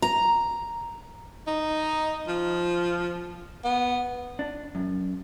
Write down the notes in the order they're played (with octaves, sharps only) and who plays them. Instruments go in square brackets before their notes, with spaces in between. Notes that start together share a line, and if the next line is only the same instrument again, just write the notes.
[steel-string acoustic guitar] A#5
[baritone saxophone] D#4
F3
B3
[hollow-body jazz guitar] D4
F#2